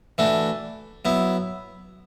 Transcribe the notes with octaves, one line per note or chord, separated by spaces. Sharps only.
E3 A3 D4 F#4
F#3 B3 E4